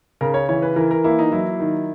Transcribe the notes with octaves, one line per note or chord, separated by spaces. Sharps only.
C#3 A#4
C#5
E3 C#5
B4
E3 A#4
A#4
A#3 E4
D#4
F#3 E4
D#3